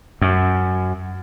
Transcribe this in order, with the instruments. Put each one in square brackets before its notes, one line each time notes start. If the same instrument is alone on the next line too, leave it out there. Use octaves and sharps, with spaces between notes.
[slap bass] F#2